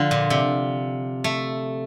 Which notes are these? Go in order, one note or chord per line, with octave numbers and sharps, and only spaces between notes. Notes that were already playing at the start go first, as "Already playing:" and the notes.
Already playing: D3 F3
A#2
C3
A3